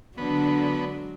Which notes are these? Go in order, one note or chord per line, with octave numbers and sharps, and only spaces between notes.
D3 F#3 G#3 B3 D4